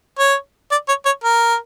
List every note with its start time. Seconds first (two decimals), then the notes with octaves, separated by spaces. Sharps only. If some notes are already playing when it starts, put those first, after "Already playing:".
0.19 C#5
0.71 D5
0.89 C#5
1.06 C#5
1.24 A#4